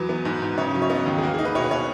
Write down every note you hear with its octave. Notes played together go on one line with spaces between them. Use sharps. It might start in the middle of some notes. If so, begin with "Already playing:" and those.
Already playing: E2 F#3 B4
B3
G#2
G#2
C#3 C#5
F#3
C#5
B3 D#5
D#2
G#4
A#3 F#4
G#4
D#4
B4
B2 C#5
B4
B2 C#5